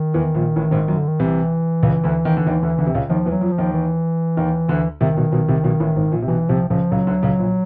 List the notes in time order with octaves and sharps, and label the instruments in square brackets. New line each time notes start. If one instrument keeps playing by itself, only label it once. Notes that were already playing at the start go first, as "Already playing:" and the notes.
Already playing: [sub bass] D#3
[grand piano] E2 E3
A#1 A#2
A1 A2
G#1 G#2
F#2
[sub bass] D3
D#3
[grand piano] C2 C3 [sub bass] E3
[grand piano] C#2 C#3
D2 D3
D#2 D#3
D3
D#2 D#3
D2 D3
D2 D3
C3
C#2 C#3
[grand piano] D#2 D#3 [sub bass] F3
[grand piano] E2 E3
[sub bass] F#3
[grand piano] F2 F3
[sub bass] F3
[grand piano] D#2 D#3
[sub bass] E3
[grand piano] D#2 D#3
D2 D3
[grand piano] C2 C3 [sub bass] D#3
[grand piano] B1 B2
B1 B2
C2 C3
B1 B2
A1 A2
G#1 G#2
A#1 A#2
C3
[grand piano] B1 B2 [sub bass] E3
[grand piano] C2 C3 [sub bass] F3
[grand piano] C#2 C#3 [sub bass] F3
[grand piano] C#2 C#3 [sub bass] F#3
[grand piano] D2 D3
C#2 C#3
A#1 A#2